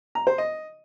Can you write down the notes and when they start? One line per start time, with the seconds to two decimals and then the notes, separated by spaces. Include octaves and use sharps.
0.15 A#5
0.27 C5
0.38 D#5